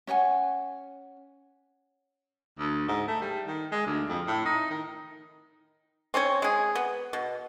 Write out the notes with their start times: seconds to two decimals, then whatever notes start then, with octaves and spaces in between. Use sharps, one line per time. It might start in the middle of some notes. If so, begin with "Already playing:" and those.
0.07 C#4 C#5 F#5 G#5
2.59 D2
2.88 G#2
3.08 A3
3.22 G3
3.47 D#3
3.72 G#3
3.86 D2
4.09 F2
4.28 A2
4.45 D#4
4.70 D#3
6.14 C4 C#4 C5 C#5
6.42 G#3 G#4
6.75 B3
7.13 B2